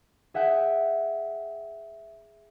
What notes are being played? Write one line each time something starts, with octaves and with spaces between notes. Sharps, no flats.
G#4 E5 F#5 G5